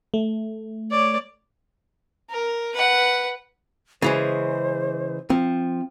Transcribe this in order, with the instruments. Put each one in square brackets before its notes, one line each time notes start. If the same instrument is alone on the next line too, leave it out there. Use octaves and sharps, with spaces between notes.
[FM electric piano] A3
[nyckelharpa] C#5 D5
[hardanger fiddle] A#4
B4 F#5
[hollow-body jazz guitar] C#3 E3 G#3 [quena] C5
[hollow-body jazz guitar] F3 [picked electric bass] C4